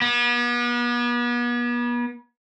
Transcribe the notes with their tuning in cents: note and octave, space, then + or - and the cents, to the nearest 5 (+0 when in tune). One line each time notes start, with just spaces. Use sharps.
B3 -40